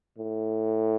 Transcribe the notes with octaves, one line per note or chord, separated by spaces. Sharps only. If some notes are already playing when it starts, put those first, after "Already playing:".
A2